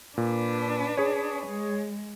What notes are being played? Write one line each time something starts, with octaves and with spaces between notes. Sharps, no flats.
A#2 D4 B4
G#4 C#5
G#3